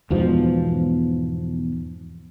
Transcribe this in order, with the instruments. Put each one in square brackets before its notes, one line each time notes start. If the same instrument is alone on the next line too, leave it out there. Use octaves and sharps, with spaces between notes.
[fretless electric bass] E2 G#2 B2 F3